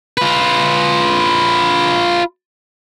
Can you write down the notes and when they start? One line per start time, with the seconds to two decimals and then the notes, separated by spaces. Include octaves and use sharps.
0.18 F4 B4